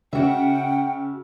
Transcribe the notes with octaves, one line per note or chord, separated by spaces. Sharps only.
C#3 F#4 E5 F#5 G5